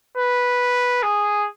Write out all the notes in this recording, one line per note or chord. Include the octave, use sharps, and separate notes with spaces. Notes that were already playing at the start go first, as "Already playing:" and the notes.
B4
G#4